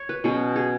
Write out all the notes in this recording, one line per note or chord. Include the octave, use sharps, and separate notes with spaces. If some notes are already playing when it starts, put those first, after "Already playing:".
Already playing: C#5
B4
B2 F#3 C#4 G#4
G#4